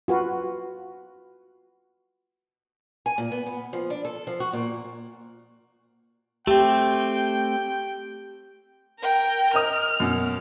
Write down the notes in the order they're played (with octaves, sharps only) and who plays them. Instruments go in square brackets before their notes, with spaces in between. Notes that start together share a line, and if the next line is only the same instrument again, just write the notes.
[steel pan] F4 F#4 B4
[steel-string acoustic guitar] G#5
A#2
B3
B3
F3
D4
A4
F3
F#4
A#2
[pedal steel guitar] A3 C4 [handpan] G4 [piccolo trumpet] G5
[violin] A#4 G5
[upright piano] A#4 D#5 D#6 [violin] F6
[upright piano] F#2 B2